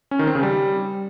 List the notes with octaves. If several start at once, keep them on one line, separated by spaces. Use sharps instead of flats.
C#4
D#3
C4
C#3
G3